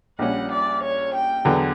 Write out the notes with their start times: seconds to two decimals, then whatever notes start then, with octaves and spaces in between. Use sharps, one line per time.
0.19 A#1 A#2 G3 C#4 F#5
0.51 D5
0.82 C#5
1.14 G5
1.45 E2 D3 F#3 B3